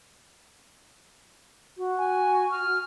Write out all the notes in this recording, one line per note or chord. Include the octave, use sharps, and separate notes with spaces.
F#4
G#5
F6